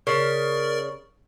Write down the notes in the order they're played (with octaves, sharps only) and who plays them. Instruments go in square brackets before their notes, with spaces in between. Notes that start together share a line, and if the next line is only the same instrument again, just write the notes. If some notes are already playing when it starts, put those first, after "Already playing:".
[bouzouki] C#3 [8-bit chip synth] A#4 D5